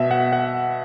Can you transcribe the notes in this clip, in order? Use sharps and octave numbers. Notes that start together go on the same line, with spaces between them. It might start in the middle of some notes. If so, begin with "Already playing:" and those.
Already playing: B2 E5
F#5
F#5